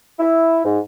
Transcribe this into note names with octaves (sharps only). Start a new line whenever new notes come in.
E4
G#2